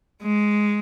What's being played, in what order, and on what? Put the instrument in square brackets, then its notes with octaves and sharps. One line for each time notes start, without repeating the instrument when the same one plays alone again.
[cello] G#3